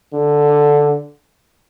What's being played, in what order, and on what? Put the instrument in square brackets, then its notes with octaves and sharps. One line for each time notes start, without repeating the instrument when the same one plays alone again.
[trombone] D3